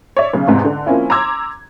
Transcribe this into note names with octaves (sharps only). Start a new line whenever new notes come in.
C#5 D5 E5
B1 C#3
E2 G#2 C3
D3
F3 A#3 C4 C#4 E4
A#5 C6 D6 E6 G#6